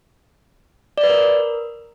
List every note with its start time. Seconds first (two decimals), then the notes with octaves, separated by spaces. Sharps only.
0.98 D5
1.04 B4
1.09 A#4